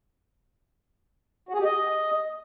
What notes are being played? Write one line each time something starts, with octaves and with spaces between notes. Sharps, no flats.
F#4
G#4
G4
D#5